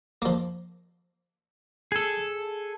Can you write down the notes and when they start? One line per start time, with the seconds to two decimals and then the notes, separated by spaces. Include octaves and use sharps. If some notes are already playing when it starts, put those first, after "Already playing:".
0.22 F3 A#3
1.92 G#4 A4